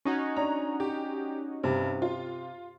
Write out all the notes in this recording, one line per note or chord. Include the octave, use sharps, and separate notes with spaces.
C#4 D#4 F#4
D4 A#5
G4
G2 C3
F4